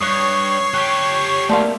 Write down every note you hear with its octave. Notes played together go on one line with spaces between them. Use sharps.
G2 C#5 C#6 D#6 F#6 C7
G4 A4 F#6 B6
A3 A#3 D5 F5 A5 C6